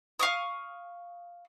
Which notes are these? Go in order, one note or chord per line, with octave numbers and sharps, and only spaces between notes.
F5 C#6 D#6